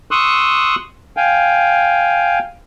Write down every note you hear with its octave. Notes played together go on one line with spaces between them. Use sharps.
C6 C#6 D#6 E6 F#6
F5 G5 G#5